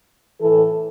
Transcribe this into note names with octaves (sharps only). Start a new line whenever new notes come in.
A2 E3 A4